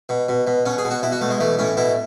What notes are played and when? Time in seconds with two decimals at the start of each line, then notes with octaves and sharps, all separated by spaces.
0.09 B2
0.28 B2
0.47 B2
0.66 B2 C#4
0.78 G#4
0.85 B2
0.91 F#4
1.02 B2 E4
1.12 F#4
1.21 B2 A3
1.30 G#3
1.40 E3 A3
1.59 A2 C#4
1.77 B2 E4